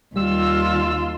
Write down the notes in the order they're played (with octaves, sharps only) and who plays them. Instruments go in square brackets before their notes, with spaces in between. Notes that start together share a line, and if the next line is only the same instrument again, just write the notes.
[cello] D#2 F4 [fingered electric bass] G3 [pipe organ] E6